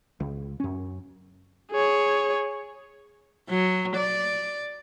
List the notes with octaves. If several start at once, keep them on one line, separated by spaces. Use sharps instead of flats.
C#2
F#2 C#4
G#4 C#5
F#3
D5